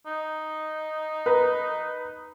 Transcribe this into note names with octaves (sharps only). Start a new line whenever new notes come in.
D#4
B4 A#5